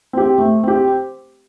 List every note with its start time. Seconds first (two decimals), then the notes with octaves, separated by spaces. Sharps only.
0.13 C4 G4
0.38 A3
0.63 C4 G4